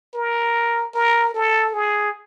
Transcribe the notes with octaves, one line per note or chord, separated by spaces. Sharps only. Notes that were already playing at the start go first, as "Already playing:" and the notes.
A#4
A#4
A4
G#4